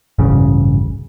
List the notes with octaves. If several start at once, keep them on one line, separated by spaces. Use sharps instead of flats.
E1 A1 G2 C#3